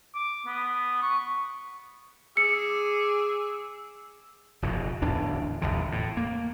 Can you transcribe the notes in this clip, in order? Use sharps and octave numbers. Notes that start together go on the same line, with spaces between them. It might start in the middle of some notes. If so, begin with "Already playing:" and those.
D6
B3
C#6
G#4 D6 E6 C#7
F1 G#2 B2
D1 E2 E3 D4
D#1 B1 E2 D3
A2
A#3